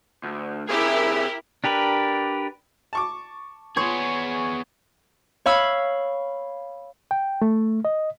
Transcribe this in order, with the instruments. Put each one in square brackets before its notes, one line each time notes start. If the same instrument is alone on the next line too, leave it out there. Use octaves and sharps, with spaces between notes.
[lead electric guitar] D2
[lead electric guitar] C3 G#4 [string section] E4 G4 A#4 [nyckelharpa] E5
[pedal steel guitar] D4 G4 A#4 B4
[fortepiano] A5 C#6 D6
[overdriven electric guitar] B3 G#4 [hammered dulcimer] C#5
[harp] C#5 F5 B5 E6
[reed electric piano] G5
A3
D#5